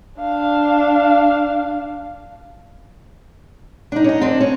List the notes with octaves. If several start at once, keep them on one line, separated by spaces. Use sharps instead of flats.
D4 F5
D4 D#4
C#4 D#5
C4 D4
C#4